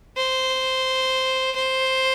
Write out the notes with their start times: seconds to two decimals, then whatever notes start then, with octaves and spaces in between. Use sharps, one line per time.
0.17 C5
1.56 C5